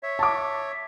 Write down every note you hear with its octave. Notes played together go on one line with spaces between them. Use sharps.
C#5 E5
A5 D6